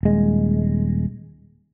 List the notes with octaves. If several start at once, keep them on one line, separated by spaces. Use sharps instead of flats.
D#1 G#3